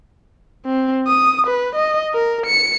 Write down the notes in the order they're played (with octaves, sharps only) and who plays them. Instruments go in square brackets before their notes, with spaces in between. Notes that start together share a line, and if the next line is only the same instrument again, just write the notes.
[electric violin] C4
D#6
B4
D#5
A#4
C#7